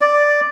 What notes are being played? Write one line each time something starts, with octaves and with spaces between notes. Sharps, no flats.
D5